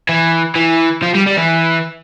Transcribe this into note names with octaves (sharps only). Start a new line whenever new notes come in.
E3
E3
F3
G3
G3
E3